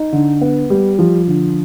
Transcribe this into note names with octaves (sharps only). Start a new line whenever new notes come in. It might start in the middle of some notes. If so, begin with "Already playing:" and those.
Already playing: D#4
D3
B3
G3
F3
D3